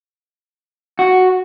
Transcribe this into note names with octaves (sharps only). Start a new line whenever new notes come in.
F#4